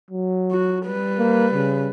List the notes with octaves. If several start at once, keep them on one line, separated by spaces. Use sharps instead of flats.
F#3
F#4
G3 B4
A#3
C#3